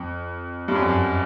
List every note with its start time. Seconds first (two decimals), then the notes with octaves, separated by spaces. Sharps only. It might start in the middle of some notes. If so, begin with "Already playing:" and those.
Already playing: F2
0.68 G2
0.75 F#2
0.82 F2
0.89 F#2